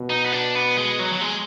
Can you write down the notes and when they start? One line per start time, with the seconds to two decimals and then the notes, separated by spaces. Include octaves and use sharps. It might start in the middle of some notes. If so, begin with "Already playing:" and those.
Already playing: B2
0.10 D#4
0.25 B3
0.33 D4
0.55 B3
0.77 G#3
0.99 F#3
1.13 F#3
1.21 G#3